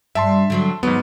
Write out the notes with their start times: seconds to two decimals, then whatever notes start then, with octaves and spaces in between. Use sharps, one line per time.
0.15 G2 E5 A5 C6
0.50 D3 F#3 C4
0.83 D#2 G#2 F#3 B3